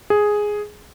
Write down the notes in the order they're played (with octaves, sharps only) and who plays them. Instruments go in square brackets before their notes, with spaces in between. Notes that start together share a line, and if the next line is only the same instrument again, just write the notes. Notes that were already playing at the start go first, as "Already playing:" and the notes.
[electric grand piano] G#4